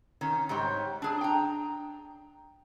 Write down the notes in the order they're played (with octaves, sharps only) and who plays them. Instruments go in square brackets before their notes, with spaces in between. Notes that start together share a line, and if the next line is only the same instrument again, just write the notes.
[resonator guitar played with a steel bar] D#3 C#4
G#2 G3 G4 C#5
D4 G#4
G5 A#5